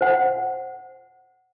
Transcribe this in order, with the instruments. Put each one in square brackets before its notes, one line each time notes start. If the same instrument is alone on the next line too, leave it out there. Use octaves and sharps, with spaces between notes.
[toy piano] C5 F#5